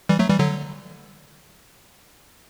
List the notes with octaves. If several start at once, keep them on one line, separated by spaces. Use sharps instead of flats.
E3 G3
F#3 A3
E3 G3
D3 F#3